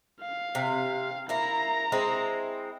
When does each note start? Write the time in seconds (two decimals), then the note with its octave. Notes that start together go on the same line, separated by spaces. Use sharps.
0.21 F5
0.55 C3
1.29 A#3 E4 A#5
1.92 G#3 C4 E4